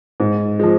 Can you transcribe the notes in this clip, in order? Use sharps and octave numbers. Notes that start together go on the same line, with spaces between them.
G#2
F3 G#3